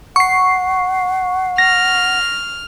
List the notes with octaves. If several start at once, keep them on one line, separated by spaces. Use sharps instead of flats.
F#5 C#6 C7
F6 A#6